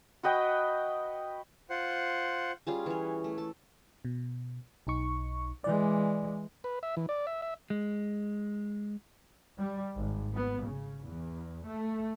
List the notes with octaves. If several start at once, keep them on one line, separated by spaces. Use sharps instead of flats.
F#4 B4 D#5 G5
F4 C5 F#5
G3 C#4 F4 G#4
E3 C#5
A3
A4
B2
B1 D#4 C#6
E3 G#3 D5
B4
E5
E3
D5
E5
E5
G#3
G3
G#1
B3
C#3
E2
A3